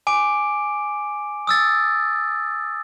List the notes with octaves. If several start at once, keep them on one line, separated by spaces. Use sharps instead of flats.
G#5 D6 D7
D#6 E6 A6